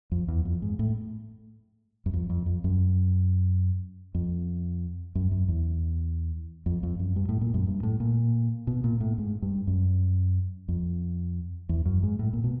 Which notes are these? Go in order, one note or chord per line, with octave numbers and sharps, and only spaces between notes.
F2
E2
F2
G#2
A2
F#2
F2
F2
F2
F#2
F2
F#2
F#2
E2
F2
F2
F#2
G2
A2
A#2
F#2
G2
A2
A#2
B2
A#2
A2
G#2
G2
F#2
F2
E2
F#2
G#2
A2
A#2
B2